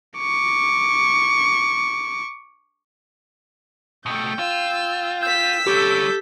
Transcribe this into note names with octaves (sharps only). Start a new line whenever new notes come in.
C#6 D6
B2 A3 G5
F4 E6
E6 G6 B6
G3 C#4 G4 A4 G6